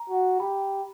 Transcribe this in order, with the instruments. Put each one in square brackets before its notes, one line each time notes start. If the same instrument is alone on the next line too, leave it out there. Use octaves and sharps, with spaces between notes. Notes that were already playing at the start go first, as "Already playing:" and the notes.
Already playing: [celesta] A#5
[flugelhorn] F#4
[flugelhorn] G4 [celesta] B5